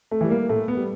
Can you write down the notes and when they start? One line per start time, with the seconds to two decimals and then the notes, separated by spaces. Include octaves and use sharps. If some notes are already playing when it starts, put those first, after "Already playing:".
0.11 A3
0.21 E3 G3
0.31 A#3
0.49 A2 A3
0.68 B3
0.77 G3